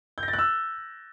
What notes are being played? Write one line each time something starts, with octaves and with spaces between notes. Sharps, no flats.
G6
A#6
A6
F#6
E6